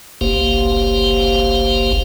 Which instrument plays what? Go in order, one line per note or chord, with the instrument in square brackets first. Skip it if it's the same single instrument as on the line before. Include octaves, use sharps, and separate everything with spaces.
[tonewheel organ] F#1 C2 A#3 G4 C5 F5